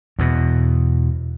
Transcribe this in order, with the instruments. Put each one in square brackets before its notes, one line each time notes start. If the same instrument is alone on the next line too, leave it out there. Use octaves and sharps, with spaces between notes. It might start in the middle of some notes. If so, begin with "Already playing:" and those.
[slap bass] E2 B2